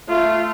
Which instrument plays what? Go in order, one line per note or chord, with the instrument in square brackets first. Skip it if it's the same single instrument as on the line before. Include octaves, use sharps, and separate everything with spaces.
[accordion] A3 [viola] F4